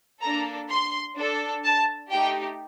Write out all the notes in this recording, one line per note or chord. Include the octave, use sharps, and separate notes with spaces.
A#3 D4 A4 A#5
C6
D4 A4
A5
A3 D#4 G4 G5